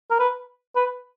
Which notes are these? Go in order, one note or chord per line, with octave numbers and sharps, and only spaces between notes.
A#4
B4
B4